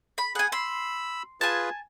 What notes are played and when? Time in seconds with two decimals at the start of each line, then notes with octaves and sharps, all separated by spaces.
0.18 B5
0.35 G#4 F#5 G#5
0.52 B5 C6 E6
1.41 F4 G#4 B4 G#5 A5